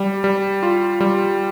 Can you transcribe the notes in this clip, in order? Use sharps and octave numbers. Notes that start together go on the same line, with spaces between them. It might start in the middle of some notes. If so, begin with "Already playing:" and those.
Already playing: G3
G3
F4
G3